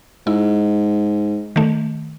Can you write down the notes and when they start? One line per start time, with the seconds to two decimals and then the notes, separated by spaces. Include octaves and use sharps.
0.27 G#2 E4
1.56 D#3 A3